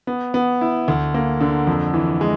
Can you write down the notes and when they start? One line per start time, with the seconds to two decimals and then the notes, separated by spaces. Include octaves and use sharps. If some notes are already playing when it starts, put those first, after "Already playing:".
0.07 B3
0.34 B3
0.61 E4
0.88 D2
1.14 A#3
1.41 D3
1.67 F2
1.94 E3
2.21 G#3